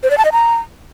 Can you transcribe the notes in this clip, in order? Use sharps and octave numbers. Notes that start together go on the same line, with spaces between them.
C5
D5
A5
D#5
A#5